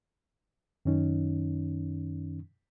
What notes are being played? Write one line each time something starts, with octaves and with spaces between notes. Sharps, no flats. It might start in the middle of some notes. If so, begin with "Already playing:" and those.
F#2 D#3 C#4 D#4